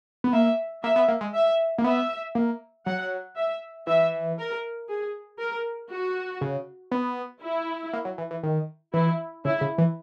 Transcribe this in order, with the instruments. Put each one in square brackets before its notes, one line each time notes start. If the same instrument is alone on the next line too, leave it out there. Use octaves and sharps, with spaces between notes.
[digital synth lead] B3
[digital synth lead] A#3 [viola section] E5
[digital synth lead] A#3 [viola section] E5
[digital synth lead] B3
A#3
G#3
[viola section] E5
[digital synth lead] A#3
[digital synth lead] B3 [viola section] E5
[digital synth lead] A#3
[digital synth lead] F#3 [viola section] F#5
[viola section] E5
[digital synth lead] E3 [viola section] E5
[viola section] A#4
G#4
A#4
F#4
[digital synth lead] C#3
B3
[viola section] E4
[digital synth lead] A#3
F#3
E3
E3
D#3
[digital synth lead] E3 [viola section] E4
[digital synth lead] C#3 [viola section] E4
[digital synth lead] C#3
E3